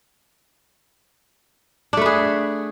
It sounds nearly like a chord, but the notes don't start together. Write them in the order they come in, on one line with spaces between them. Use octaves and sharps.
D4 A3 B4 G#4